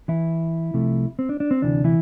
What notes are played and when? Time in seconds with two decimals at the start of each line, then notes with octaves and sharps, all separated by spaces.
0.08 E3 E4
0.74 C2 C3 F3 A3
1.19 C4
1.29 D4
1.40 D4
1.51 C4
1.62 D2 C3 E3 D4
1.84 E3 E4